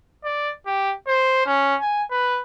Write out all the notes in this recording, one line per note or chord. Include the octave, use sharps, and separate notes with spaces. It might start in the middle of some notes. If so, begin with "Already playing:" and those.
D5
G4
C5
C#4
G#5
B4